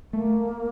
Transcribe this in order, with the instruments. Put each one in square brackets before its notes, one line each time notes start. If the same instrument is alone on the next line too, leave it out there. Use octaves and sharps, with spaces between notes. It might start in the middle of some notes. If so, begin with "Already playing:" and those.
[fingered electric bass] A3 [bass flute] A#3